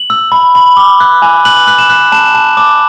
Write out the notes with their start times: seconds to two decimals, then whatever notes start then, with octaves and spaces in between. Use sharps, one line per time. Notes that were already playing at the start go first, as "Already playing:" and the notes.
Already playing: F#7
0.10 E6
0.32 B5
0.55 B5
0.77 D6
1.00 F#6
1.22 G#5
1.45 F#6 F#7
1.67 F#6 F#7
1.79 E7
1.90 F#6
2.12 A5 E7
2.34 A5
2.57 D6